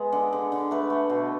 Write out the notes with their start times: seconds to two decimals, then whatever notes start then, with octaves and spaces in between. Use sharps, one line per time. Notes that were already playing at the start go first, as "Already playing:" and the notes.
Already playing: G#3 B3
0.12 D3
0.33 D3
0.52 D3
0.71 A3 B4
0.90 A3
1.10 B2